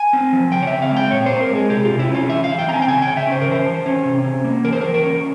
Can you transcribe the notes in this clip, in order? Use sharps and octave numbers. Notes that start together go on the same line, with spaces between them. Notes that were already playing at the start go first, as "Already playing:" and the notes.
Already playing: G#5
C4
F3
C#3 G5
C#5
C4 E5
F5
G#3 G5
A#2 C#5
C4 C5
A#4
G#3 G#4
C3 G4
C3 F4
E4
C#4
F4
E3 E5
F5
E3
G5
C4 A#5
G#5
G5
C#3 G#5
C#3 G5
E5
C#4 C5
A#4
E3 C5
E3
C#4
C3
C#4
A#3
E3 A#4
C5
E3 A#4
A#4
C#4